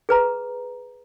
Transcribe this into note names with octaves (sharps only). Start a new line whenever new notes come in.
G#4 B4 A#5